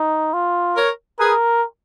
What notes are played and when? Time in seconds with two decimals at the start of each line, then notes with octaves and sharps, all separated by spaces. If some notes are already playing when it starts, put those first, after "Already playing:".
Already playing: D#4
0.34 F4
0.76 A#4 C#5
1.19 G#4 A#4 B4